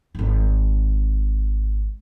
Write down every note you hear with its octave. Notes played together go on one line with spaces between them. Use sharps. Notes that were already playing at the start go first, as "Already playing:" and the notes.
D#1 G#1